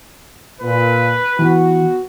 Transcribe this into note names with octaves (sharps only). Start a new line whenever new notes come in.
A#2 B4
E3 B3 F#4